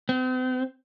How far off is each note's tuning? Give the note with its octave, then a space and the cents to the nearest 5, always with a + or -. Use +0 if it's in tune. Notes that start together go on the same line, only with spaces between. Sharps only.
C4 -40